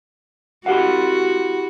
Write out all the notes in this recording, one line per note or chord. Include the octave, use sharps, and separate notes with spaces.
E4 F#4 G4 F5 F#5